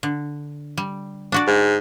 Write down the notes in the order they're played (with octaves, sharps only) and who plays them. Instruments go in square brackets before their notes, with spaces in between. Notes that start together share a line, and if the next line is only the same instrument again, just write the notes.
[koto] D3
G3
D4 F#4 D5
[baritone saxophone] G#2